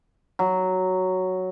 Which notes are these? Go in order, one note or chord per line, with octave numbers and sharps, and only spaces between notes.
F#3